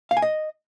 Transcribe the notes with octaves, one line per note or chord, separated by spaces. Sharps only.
F5
G#5
D#5